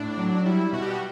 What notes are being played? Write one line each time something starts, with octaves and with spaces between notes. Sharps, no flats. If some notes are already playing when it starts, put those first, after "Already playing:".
Already playing: A2 D4
F#3
G3 E4
B2 F#4
G4
F#4